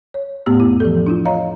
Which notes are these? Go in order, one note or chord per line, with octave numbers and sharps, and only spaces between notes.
C#5
A2 A3 B3 G4 E6
F2 E4
E3 F3 G4 A4
D4 E4 F4
C#5 D#5 F5 A#5